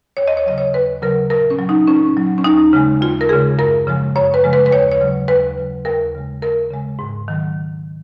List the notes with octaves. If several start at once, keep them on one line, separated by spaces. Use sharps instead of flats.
D#2 C#5
D#5
C#5
C#3 F#3 D#5
C#5
D#2 B4
C#3 F#3 A#4
A#2 A#4
C#4
F#3
D#4
A#2 C#4
F#3
C#4
D#2 D#4
C#3 G#3
D#2 F4
A#4
C#3 G#3 G#4
F#2 A#4
C#3 F3 G#3
F#2 C#5
B4
C#3 F3 G#3
B4
B4
D#2 C#5
C#5
C#3 F#3
D#2 B4
C#3 F#3
D#2 A#4
C#3 G#3
D#2 A#4
C#3 G#3
G#2
D#3 F#3